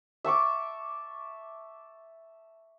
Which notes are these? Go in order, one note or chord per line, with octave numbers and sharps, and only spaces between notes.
E5 A5 C#6 D6